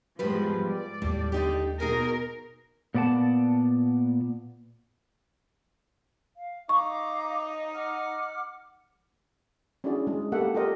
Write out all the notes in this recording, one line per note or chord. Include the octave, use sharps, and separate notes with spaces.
E2 G#2 F3 G3 G#3 B4
D5
D#2 A2 G3 G#3
D3 D#4 G4
B2 D#4 G#4 A#4 G#5
A#2 B3 D5 F#5 A5
F5
D#4 F5 A#5 C#6 D6
F#5 D6 F6
C#4 D4 E4 F#4 G#4 D5
G#3
A#3 G4 A4 E5 F#5
F4 G4 A4 A#4 D5 D#5